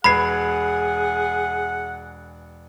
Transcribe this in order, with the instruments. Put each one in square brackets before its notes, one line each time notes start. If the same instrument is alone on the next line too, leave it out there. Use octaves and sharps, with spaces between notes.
[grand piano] E1 B4 G#6 [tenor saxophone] G#4 [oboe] F#5 [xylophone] B5 C7